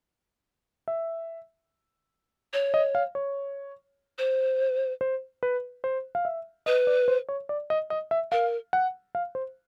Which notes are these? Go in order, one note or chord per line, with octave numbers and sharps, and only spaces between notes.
E5
C#5
D#5
F5
C#5
C5
C5
B4
C5
F5
E5
B4 D#5
D5
C5
C#5
D5
D#5
D#5
E5
A#4 F5
F#5
F5
C5